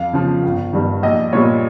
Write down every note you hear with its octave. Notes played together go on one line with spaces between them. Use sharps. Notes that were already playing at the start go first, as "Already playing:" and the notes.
Already playing: F2 F5
C#3 F3
G1
G2 D#3 G3
A#1 D#5
A#2 G3 C#5